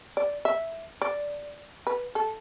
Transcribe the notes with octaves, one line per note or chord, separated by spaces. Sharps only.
D5
E5
D5
B4
A4